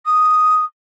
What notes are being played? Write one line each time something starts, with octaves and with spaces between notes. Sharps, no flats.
D#6